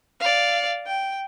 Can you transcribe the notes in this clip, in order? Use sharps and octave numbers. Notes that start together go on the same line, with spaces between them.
D5 F5
G5